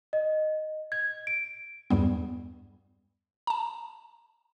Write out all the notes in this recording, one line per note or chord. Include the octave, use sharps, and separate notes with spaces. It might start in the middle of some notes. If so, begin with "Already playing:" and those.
D#5
G#6
D7
E2 G2 G3 B3
A5 A#5